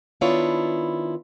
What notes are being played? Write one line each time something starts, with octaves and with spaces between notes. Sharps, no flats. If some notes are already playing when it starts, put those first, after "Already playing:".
D#3 B3 D4 E4 F4 C#5